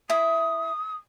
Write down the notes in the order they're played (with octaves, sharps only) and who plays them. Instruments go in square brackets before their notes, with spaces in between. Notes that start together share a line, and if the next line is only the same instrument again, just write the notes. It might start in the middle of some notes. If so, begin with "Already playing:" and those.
[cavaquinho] E4 E5 [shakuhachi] D#6